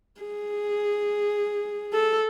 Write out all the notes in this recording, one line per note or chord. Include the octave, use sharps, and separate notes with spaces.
G#4
A4